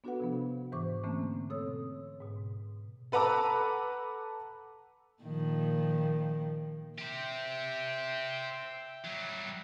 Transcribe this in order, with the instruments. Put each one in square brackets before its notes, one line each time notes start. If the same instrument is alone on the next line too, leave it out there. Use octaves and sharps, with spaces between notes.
[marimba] B3 D4 F#4 A4 B4 F#5
C3 F3 B3
G#2 E3 C5 C#6 D6
D3 E3 A3 A#3 C4 C#4
B2 C4 A4 C#5 D#6 E6
G#2 B2
[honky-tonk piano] A4 B4 F#5 A#5 D6 E6
[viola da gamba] A#2 D#3 F3
[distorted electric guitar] G4 C5 [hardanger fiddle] E5 G5
[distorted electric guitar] F#3 G3